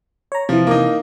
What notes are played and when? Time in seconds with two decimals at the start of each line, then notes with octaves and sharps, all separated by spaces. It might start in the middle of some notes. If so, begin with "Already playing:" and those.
0.32 C#5 A#5
0.49 C3 E3 F3
0.67 A#3 D#4